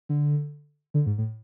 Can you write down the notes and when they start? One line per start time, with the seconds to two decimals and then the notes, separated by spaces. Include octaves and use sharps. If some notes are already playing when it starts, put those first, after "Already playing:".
0.09 D3
0.94 D3
1.06 G#2
1.18 A2